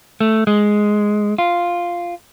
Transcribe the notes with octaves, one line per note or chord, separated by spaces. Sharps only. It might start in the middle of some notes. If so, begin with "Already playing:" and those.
A3
G#3
F4